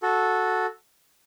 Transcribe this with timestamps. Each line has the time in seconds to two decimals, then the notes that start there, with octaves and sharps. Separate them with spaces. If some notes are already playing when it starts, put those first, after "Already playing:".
0.02 F#4 A4